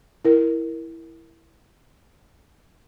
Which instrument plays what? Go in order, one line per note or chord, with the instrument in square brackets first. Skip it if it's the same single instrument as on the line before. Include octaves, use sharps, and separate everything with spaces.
[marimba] E4 A#4